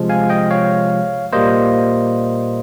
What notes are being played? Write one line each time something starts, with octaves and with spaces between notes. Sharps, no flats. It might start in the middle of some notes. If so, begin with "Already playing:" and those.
Already playing: C3 F3 G#3
F5 G#5
D#5 G5
C#5 F5
A#2 G3 A#3 C5 D#5